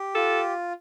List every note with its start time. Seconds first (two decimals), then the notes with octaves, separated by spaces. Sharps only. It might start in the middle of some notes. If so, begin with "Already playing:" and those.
Already playing: G4
0.15 F4 A4